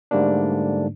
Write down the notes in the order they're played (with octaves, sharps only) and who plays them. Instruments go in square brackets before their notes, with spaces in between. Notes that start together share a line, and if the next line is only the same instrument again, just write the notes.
[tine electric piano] G#2 D3 G3 A3 A#3 D4